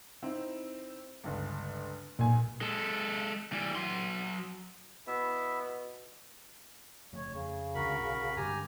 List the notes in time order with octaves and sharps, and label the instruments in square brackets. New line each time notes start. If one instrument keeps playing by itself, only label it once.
[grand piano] C4 D#4 E4
G1 C#2
[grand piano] B1 G#5 [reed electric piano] A#2
[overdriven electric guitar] G#3 A4
E3 G3
F#3 C6
[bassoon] B2 [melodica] B3 E4 E5
[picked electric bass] F#1 F3 A3 [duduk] C#5
[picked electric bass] F2 [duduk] C#3
[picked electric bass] C#2 D3 [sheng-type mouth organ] F#4 A#4 B5
[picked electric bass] B1
[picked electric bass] G2 D3 G#3 [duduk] G4 [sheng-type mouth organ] G#5 A#5